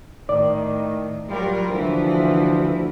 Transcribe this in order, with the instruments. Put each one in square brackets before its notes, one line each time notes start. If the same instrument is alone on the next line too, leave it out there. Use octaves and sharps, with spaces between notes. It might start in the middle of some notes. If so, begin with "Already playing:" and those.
[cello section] A2 [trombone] D#3 [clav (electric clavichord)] D5
[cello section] F#3 F4 A#4 [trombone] G3
[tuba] D2 [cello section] E3 [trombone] F3